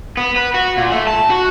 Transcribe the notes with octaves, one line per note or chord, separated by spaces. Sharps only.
B3
B4
F#4
A#2
A3
A5
F#4